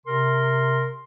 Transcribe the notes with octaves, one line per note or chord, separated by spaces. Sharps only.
C3 A#4 C6